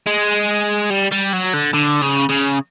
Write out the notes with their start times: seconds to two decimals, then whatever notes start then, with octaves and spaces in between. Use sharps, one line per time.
0.07 G#3
0.90 G3
1.11 G3
1.33 F#3
1.54 D3
1.74 D3
2.02 C#3
2.29 C#3